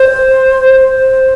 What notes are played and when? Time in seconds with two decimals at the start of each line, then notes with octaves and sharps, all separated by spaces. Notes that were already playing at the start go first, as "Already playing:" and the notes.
Already playing: C5
0.69 C5